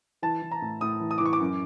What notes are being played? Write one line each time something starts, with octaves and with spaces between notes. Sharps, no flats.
E3 A5
E3
A#5
A2
A2 D#6
E3
D#6
E3 D6
C#6
D6
F#2